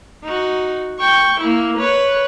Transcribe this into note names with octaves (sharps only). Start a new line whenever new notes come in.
D#4 F#4
G5 C#6
A#3 E4
B4 C#5